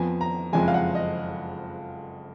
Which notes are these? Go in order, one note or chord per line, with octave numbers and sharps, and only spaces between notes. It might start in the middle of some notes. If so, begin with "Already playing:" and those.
Already playing: F2 F3 B3 G#5
A#5
F#1 F2 F3 G#3 G#5
F5
F#5
D#5